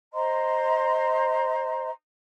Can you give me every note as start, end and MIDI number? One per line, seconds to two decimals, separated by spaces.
0.13 1.89 72
0.13 1.89 75
0.13 1.89 82
0.13 1.89 84